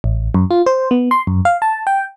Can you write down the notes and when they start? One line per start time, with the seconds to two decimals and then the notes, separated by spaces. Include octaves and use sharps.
0.04 A1
0.34 F#2
0.51 F4
0.66 C5
0.91 B3
1.11 C6
1.27 F#2
1.45 F5
1.62 A5
1.87 G5